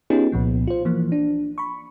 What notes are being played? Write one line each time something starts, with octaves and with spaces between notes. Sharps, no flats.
B3 C#4 D#4 F4 G4 G#4
C2 A#2 F3 B3
F4 C5
E3 F3 A#3
D4
B5 C#6